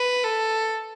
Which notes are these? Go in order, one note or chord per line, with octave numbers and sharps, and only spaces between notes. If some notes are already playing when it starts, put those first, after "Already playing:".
Already playing: B4
A4